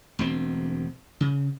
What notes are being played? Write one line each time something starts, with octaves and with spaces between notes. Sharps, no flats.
E1 D2 C4
C#3